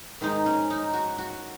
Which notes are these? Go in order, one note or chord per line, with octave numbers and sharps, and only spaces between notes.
G#2 D#3 G#3 D#4
C#4
D#4
F#4
F#4